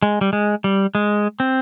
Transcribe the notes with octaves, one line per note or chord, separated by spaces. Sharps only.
G#3
G3
G#3
G3
G#3
C4